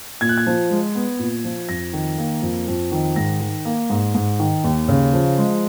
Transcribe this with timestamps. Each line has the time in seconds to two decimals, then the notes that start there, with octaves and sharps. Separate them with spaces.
0.21 A#2 G#6
0.29 F#6
0.38 G#6
0.47 F3
0.71 G#3
0.95 B3
1.19 A#2
1.44 F3
1.69 F2 A#6
1.93 D#3
2.18 A#3
2.42 F2
2.68 F2
2.92 D#3
3.16 G#2 A#6
3.41 D#3
3.65 A#3
3.90 G#2
4.15 G#2
4.40 D#3
4.64 D#2
4.88 C#3
5.13 F3
5.38 G#3